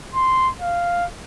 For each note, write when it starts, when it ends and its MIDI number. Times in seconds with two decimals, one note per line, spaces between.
0.15 0.49 84
0.61 1.05 77